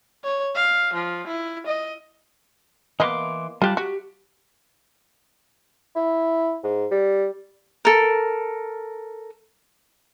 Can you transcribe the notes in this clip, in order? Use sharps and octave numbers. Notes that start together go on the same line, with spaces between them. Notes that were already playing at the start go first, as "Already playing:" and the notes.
C#5
F5
F3
E4
D#5
E3 A#3 B3 D#5 C6 D6
G3 F4 G4 A5 F#6
F#4 G4
E4
G#2
G3
A4 A#4